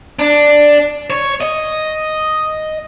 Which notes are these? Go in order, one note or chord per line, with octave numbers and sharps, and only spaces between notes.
D4
C#5
D#5